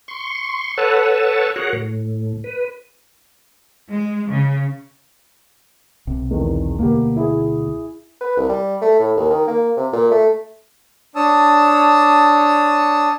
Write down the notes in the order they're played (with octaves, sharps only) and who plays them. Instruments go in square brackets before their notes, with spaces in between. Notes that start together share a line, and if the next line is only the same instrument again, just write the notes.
[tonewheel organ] C6 C#6
A4 B4 C#5 F#5 A5 E6
F#4 G#4 A#4 C#5 F#5
A2
B4
[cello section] G#3
C#3
[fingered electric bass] B1 C3
[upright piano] E2 D#3 G#3
[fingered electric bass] D2 B2 [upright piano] A#3 G4
[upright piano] E4 G#4
[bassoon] B4
C2
G3
A3
A2
D#2
D#3
A#3
C3
A#2
A3
[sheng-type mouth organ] D4 C#5 A5 D#6 E6